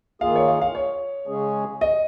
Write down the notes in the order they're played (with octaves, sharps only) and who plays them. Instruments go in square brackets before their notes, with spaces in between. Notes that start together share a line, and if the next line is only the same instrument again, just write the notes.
[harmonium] D#3 A#3 F4 G#4 [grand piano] F5
[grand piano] C#5
F5
F5
C#5
[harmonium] C#3 G#3 C#4 G#4
[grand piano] D#5